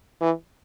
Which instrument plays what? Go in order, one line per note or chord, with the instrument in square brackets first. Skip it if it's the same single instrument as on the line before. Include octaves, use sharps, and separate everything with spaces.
[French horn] E3